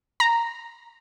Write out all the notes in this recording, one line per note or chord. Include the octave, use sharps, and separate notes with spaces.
A#5